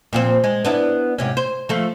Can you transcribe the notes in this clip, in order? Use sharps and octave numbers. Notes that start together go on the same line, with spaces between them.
A#2 F3 C4
G#3
B3 D4 E4
G#2 C3 C#4
C5
F3 A3